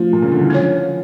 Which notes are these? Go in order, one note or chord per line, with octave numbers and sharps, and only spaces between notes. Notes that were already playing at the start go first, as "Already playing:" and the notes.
Already playing: F3 A3 D4 F4
A#2
C#3
D3
E3
F3 C#4 F4 C#5